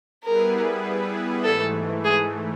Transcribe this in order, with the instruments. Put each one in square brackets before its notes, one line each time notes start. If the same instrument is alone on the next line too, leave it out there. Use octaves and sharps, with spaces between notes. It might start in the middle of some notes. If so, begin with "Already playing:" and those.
[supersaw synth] G3 B3 E4 G#4 B4 [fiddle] A#4
[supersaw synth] G#2 E3 A3 [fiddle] A4
[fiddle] G#4